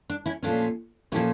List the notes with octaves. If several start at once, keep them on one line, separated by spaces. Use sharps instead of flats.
D4
C#4 E4
A#2 F3 A3 C#4 D4 F4
A#2 F3 A3 C#4 E4 G4